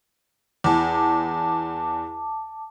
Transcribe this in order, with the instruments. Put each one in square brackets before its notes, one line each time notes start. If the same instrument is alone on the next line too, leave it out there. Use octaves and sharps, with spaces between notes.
[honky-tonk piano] E2 [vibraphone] A5 D6